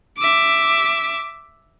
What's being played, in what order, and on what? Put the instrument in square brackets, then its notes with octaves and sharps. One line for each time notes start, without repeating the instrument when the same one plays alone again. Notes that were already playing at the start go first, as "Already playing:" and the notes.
[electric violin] E5 D6